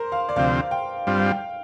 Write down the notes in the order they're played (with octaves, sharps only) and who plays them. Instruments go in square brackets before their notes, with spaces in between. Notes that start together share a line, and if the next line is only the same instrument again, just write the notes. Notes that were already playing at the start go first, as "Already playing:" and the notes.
Already playing: [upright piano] A#4 C5
F5
D5
[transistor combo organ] D2 C3 F3 C4 [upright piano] F5
[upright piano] G5
[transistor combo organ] G2 G3 C4 F4
[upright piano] F5
G5